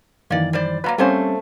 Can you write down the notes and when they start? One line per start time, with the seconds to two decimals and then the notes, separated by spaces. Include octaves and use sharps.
0.30 F#2 D#3 E3 A#3 D5
0.53 G3 C5 D5
0.84 F#3 G#3 A#3 B4 F5 A#5
0.98 G3 A3 A#3 C4 C#4 C5